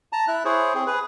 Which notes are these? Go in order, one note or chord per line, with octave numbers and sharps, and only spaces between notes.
A5 A#5
E4 E5 F#6
E4 G#4 C5 C#5
C4 G#4
G#4 B4